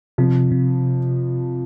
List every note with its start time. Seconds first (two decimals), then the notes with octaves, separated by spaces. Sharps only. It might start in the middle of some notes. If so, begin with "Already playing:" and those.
0.18 F2 C3 F3
0.52 C3